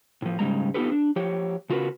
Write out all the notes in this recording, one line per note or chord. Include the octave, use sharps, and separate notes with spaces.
A2 F3
G#2 C#3 G3 G#3 A#5
B3 D#4 F4 G4 A4 B4
D4
F3 G4 C#5
C#3 F4 F#4 A#4 B4